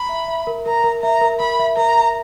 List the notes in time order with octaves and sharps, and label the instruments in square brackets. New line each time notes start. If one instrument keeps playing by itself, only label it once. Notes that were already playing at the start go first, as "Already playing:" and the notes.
Already playing: [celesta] A#5 [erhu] B5
[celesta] E5
E5
A#4
[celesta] A#4 [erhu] A#5
[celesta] A#4
[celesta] E5 [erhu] A#5
[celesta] A#4
[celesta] A#4 [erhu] B5
[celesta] E5
[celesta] A#4 [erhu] A#5
[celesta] A#4